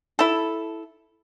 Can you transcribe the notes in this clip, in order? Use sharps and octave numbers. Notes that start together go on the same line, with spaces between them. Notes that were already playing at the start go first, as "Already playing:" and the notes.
E4 A4